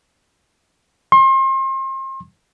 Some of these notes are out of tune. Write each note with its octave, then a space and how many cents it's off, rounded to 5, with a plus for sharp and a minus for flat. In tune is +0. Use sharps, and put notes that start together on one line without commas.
C6 +35